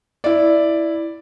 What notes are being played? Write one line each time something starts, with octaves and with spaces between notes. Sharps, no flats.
E4 D5